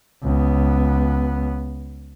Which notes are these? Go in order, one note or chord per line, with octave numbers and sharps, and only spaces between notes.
C#2 B3